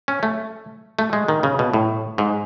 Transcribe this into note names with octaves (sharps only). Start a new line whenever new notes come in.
C#4
A3
A3
G#3
D#3
C#3
B2
A2
G#2